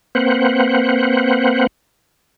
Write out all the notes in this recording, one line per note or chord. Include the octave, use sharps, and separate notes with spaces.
A#3 C4 B4 C5 F#5